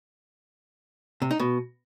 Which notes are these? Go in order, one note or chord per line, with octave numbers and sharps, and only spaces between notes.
C3
D#4
B2